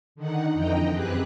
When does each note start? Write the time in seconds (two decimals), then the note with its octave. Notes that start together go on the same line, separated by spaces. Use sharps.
0.15 D3 D#3 D#4 F#5
0.53 F2 D3 E3 D#5 G5 A#5
0.92 F#2 C4 G4 G#4 B4 F#6